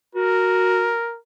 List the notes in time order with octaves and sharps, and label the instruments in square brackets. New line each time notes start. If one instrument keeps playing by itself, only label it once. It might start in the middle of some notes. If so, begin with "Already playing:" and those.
[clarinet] F#4 [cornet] A#4